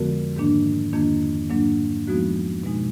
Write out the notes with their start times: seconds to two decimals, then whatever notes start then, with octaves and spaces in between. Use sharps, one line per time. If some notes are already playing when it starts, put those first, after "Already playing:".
Already playing: F2 D3 F3 G#3 B3 F#4 A#4
0.36 G#2 D#3 A#3 D4
0.93 F2 D#3 A#3 D4
1.50 G#2 F#3 A#3 D4
2.07 F2 F3 G#3 B3 D#4 F#4
2.63 B2 G#3 D#4